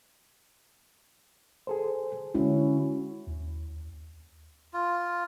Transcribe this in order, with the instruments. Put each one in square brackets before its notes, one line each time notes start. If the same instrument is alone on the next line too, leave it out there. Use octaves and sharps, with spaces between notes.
[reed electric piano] G#4 A4 C5
[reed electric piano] D3 G#3 [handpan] C#4 E4 F#4
[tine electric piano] D#2
[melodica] F4